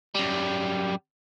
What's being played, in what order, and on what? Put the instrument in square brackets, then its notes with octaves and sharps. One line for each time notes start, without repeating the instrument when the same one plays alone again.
[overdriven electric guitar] F#2 G3